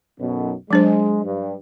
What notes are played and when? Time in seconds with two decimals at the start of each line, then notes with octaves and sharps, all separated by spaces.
0.19 B1 F#2 B2
0.71 F#3 G#3 D4 C5
1.24 G2